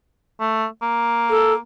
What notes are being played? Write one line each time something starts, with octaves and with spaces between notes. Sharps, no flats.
A3
A#3
A4